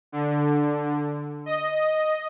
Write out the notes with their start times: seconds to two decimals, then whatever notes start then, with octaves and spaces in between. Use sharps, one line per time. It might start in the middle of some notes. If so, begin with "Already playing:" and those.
0.12 D3
1.46 D#5